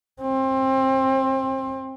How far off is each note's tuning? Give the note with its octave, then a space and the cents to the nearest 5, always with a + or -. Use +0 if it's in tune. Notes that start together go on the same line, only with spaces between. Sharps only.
C4 +25